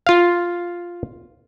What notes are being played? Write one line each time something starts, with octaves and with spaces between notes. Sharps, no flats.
F4 F5